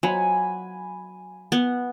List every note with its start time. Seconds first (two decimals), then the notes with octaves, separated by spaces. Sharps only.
0.03 F#3 G#5 B5
1.52 B3